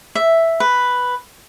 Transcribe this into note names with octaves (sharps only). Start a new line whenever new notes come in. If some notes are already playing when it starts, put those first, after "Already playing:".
E5
B4